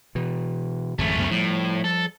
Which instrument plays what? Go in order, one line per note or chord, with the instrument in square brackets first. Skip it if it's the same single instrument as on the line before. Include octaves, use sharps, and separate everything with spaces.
[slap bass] B2 E3
[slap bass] G#1 F2 C#3 [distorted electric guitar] A3 C#4
[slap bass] C#2 F#2 B3
[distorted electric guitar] A2 [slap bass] F3 G3
[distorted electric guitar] A4